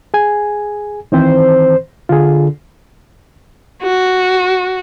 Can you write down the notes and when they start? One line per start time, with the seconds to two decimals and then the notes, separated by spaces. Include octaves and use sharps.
0.14 G#4 G#5
1.12 D#3 E3 C4 C5
2.09 D3 F4 G#4
3.83 F#4